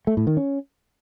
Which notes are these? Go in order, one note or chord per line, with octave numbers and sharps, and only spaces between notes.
A3
A2
D#3
C#4